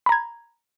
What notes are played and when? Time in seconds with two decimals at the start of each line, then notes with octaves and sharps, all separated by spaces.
0.06 B5
0.09 A#5
0.12 G#6